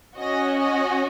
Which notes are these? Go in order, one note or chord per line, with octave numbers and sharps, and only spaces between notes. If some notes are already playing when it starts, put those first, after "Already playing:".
C#4 F#4 D#5
D#5